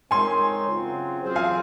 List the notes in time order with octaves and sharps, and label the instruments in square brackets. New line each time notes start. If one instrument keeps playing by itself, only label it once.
[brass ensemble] G#3 C4 D#4 A#4 C#5 [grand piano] G#5 C6
[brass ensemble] C#3 F#3 C4 F4
F#3 C4 F4 G#4 C5
[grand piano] F5 G#5